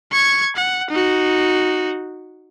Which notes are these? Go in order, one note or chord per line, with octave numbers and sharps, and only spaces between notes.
C#6 G#6
F#5
D#4 F#4